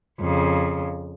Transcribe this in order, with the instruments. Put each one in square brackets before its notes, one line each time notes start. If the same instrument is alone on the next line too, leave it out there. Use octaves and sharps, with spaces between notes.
[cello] F2 C#3